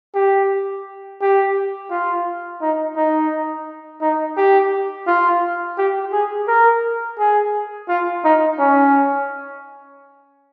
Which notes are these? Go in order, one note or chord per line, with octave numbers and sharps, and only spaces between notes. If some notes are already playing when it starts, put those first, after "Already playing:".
G4
G4
F4
D#4
D#4
D#4
G4
F4
G4
G#4
A#4
G#4
F4
D#4
C#4